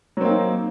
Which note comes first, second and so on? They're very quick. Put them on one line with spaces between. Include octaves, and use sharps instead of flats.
F#3 C4 A#3 D#4